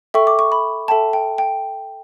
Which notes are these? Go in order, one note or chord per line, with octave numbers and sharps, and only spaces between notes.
A4 E5 G5 C#6
D6
C#6
B5
A4 E5 G5 A5
G5
G5